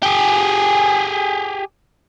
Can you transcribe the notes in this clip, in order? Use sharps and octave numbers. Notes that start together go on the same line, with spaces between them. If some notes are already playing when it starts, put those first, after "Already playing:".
G4 G#4